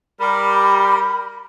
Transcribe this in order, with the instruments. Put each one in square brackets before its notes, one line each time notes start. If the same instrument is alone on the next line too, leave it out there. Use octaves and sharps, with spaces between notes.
[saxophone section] G3 [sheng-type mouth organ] A#4 [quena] B5